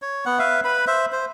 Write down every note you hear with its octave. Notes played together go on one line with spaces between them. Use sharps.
C#5
B3 F#5
B4 E5 F5
B4 B5
C5 E5
C5